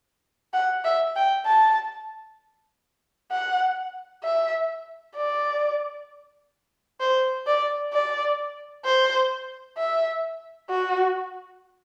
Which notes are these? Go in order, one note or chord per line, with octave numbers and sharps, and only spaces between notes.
F#5
E5
G5
A5
F#5
E5
D5
C5
D5
D5
C5
E5
F#4